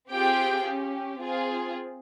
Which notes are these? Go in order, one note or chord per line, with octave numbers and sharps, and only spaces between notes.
C4 F4 G4 G#4 G5
C#4 G4
C4 F4 G#4